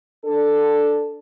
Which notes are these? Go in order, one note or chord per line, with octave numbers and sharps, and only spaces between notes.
D4 A4